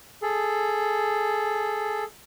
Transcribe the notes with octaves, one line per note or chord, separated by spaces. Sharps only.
G#4 A4